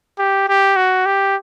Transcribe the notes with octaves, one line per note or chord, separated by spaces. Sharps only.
G4
G4
F#4
G4